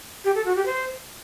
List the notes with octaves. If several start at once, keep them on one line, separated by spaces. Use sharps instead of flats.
G4
A4
F#4
G4
C5